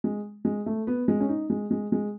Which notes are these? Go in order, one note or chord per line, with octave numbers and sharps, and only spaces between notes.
G#3
G#3
A3
B3
G#3
C#4
D#4
G#3
G#3
G#3